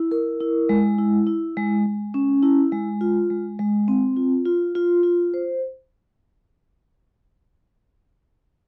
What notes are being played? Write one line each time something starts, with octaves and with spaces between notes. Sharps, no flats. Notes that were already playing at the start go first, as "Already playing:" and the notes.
Already playing: E4
A#4
E4
G#3
E4
E4
G#3
G#3
C#4
E4
G#3
F4
G#3
G#3
C4
F4
F4
F4
F4
C5